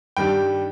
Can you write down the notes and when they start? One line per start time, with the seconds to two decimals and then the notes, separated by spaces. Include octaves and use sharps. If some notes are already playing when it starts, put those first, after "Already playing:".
0.17 G2 D#3 G3 G5